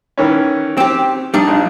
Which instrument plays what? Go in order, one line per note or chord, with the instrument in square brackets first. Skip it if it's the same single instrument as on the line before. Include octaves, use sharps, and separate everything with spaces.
[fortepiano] D#3 E3 C#4
[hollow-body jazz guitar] C4 G4
G3 D4 D#4
[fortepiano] A#1